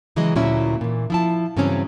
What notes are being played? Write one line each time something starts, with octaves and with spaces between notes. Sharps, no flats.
C#3 E3 F#3 G#3 F#4 D#5
D2 A#2 F#3 C#4 E4 E5
A#2 E3
F3 E4 A5
G2 C#3 E3 F#3 C4 C#4